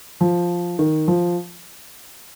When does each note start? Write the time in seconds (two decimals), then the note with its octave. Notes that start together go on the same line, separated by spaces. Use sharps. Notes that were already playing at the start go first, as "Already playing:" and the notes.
0.21 F3
0.79 D#3
1.08 F3